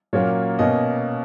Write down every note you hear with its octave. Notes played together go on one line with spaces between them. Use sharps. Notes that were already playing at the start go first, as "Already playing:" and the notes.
A#2 F#3 A#3 C#4 C#5
B2 A#3 C#4 D#5